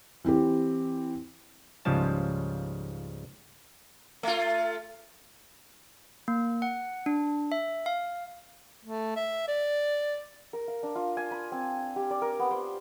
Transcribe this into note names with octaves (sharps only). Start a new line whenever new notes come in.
E3 C4 E4 G4
C#2 G#2 C#3 F3 G3 A5
A3 F4
A#3
F#5
D4
E5
F5
A3
E5
D5
A#4
F5
D4
F4
G#5
B5
C4
G4
D5
A#4
B3
C5